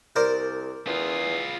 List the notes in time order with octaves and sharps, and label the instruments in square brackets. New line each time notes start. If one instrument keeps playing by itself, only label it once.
[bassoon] C2 [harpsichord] A#4 C5 D5
[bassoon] E2 [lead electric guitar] F4 G#4